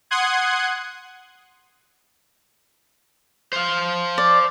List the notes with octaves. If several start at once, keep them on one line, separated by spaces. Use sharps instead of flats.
F#5 C6 D#6 F#6 G#6
C5 F5
D5